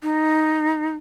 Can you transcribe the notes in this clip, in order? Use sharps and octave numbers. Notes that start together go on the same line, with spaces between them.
D#4